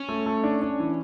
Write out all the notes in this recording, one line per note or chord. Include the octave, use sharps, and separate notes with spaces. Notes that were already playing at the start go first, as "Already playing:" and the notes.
Already playing: C#4
A3
A3
D4
D4
E3